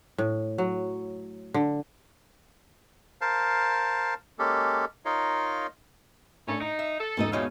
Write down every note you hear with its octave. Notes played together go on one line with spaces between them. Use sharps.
A2
F#3
D3
A#4 C5 F5 A5
G#3 A#3 C#4 G4 A4
D#4 F4 A#4 C#5 D#5 F5
A2 C#4 D4 A4
D#4 C#7
E5
A4
E2 G#2 B2 C#4 D#4 D#5
A#2 A3 C#4 D#4 F4 B4